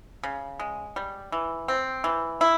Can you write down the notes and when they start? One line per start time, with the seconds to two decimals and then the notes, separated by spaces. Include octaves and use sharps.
0.23 C#3
0.60 G#3
0.96 G3
1.32 E3
1.68 C4
2.04 E3
2.41 E4